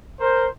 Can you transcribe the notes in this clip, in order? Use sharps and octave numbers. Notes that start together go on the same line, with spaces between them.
A#4 C5